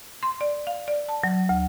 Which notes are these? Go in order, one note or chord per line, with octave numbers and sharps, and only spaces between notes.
C6
D5
F5
D5
A5
F#3
D2